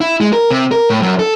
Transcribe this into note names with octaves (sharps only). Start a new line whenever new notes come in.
E4
G#3
A#4
C3
A#4
A2
F#2
A4